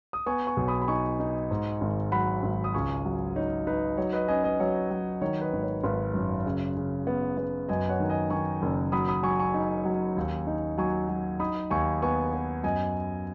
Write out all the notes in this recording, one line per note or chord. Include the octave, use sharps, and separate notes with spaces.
D#6
B3 G#5 C#6
G#5 C#6
B1
B5 D#6
B5
D#4 G#5 C#6
D#4
G#2
G#1
F#3 F#5 B5
G#1
D#6
C#2 G#5 C#6
F#3
D#4 C#5
D#4 B4
F#3 C#5
B4 D#5
C#4 D#5 G#5
B4 D#5
F#3 C#5
F#3
D#3 C#5
B4 D#5
G#1
C#5
G#1 B4
F#2
C#3
C#3
B3
B3
F#2 D#5 G#5
C#5 F#5
D#3
D#5 G#5
D#3 G#5 C#6
F#1
F#3 B5 D#6
B5 D#6
F#3 G#5 C#6
G#5 C#6
D#4
F#3
D#2
D#4
F#3 G#5 C#6
F#3
D#4 B5 D#6
D#2 G#5 C#6
B3 G#5 C#6
B3
F#2 D#5 G#5